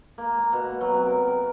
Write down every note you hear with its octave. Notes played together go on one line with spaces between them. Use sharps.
A#3
A#5
B2
F#3
C3
A#4
A#4